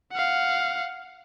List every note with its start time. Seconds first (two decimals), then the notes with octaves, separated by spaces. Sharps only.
0.12 F5 F#5